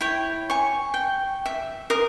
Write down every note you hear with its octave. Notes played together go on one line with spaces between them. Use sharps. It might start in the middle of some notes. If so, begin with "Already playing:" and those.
E4 C#5 G5
G#5 C#6
G5
E5
A#4 D#6